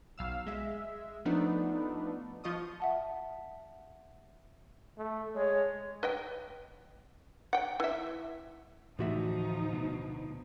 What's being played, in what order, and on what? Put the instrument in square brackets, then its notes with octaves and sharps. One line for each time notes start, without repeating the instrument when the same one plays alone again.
[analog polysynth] B1 F5 E6
G#3 E5
F3 A3 B3 D4 D#4
F3 F4 D#5 C#6 D#6
[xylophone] E5 F#5 A5
[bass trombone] A3
[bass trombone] G#3 [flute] C#5
[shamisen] B4 D#5 G5
F#5 G5
E3 E5
[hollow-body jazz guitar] D2 F#4 E5 [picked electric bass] A2 E3 A3 [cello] F3 D#4
[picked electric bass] B2